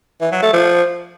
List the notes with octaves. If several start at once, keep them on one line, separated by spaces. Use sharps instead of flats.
E3
F#3
A3
F3